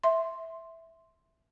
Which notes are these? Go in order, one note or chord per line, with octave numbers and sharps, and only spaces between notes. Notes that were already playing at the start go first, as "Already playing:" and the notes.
E5 C6